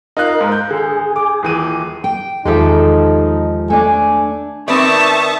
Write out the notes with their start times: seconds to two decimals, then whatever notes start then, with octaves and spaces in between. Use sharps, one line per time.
0.17 D#4 F4 A#4 F#6
0.41 G#2
0.52 G6
0.71 D3 G#4
1.16 D6
1.43 D#1 E3 D#7
2.04 G5
2.45 E2 D#3 F3 G#3 D#4 G4 A4 E5
3.70 A3 D4 G#5
4.68 D#3 C4 B4 D5 E5 A5 C#6 D#6